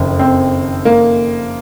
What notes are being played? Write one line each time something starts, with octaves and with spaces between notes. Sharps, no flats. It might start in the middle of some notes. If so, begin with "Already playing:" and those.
Already playing: F#1 F2 D#3
C4
A#3